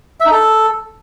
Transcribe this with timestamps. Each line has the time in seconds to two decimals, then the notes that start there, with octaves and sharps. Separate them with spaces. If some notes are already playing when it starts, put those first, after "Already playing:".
0.20 E5
0.26 D#4
0.31 A4